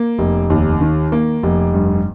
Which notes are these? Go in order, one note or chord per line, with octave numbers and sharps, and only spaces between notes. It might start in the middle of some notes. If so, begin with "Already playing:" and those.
Already playing: A#3
F1
D#2
D#3
A#3
F1
G2